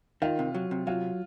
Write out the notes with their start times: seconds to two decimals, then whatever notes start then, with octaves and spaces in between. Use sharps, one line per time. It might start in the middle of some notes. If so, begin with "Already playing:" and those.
0.22 D#3 F4
0.39 C3
0.55 F#3
0.71 C3
0.87 F#3 F4